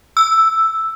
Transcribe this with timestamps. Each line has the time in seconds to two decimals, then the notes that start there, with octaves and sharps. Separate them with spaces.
0.17 E6